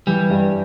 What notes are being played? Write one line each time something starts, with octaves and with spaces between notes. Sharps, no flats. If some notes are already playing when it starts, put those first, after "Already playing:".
E3 G3
G2